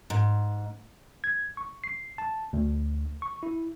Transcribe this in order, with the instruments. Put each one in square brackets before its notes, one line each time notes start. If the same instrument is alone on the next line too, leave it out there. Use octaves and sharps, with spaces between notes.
[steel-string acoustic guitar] G#2
[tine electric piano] G#6
C#6
C7
A5
D2
C#6
E4